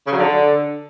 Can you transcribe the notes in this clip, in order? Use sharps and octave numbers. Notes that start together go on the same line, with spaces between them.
C#3
F#3
D3